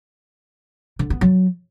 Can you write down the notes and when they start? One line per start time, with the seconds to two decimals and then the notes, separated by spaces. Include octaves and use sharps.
0.99 D3
1.10 B3
1.21 F#3